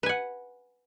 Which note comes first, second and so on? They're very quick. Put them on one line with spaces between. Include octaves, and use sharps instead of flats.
B4 G#5 F#5